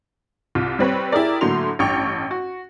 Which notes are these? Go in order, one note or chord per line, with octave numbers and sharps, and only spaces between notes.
C2 F4
G3 C4 B4 C#5
E4 G4 G#4 A#4 D5
A2 D3 F#3 A#3 C6 F7
A1 G2 G5 C#6 F7
F#4